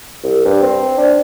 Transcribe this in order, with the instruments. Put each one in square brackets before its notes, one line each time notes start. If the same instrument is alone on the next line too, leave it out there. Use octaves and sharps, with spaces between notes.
[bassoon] C2
G2
C4
D4